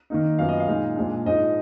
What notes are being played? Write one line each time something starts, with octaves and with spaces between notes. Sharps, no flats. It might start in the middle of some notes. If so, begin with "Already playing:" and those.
D#3 A#3 D#4
F#2 F3 B3 F5
D#5
F5
A#2 G#3 D#4
A#2 F3 G#3 D4
G#2 F3 G#3 D#4 D#5